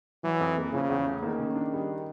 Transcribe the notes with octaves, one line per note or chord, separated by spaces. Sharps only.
E3 F#3
F2
A#3
C#3 F3
E2
A3
D#3 A#3
C#3
D4
G3